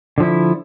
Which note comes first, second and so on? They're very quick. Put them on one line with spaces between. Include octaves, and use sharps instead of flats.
D3 F3 E4